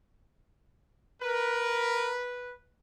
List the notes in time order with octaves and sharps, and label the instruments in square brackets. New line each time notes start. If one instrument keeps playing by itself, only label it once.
[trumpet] A#4 [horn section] B4